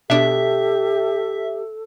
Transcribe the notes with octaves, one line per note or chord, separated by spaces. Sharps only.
B2 D4 G4 A4 E5